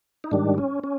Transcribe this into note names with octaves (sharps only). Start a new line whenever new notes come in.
D#4
G#2 D#3 G3 D4
C#4
C#4